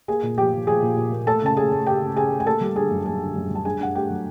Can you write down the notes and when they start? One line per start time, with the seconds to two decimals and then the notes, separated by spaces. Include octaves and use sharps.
0.08 A#3 G#4 G#5
0.23 A#2
0.38 F3 G4 G5
0.53 F3
0.67 F3 G#4 G#5
0.82 A#2
0.97 A#2
1.12 A#3
1.27 A3 A4 A5
1.42 C#3 A5
1.57 A3 G#4 G#5
1.72 A3
1.87 A3 G4 G5
2.02 C#3
2.16 C#3 G#4 G#5
2.32 A3
2.40 G#5
2.46 A#3 A4 A5
2.61 G3
2.75 D3 G#4 G#5
2.91 F#2
3.06 F#2 G#4 G#5
3.21 D3
3.35 F#2
3.50 G3 A5
3.65 D4 G#4 G#5
3.80 D4 F#5
3.95 A3 G4 G5
4.10 F#3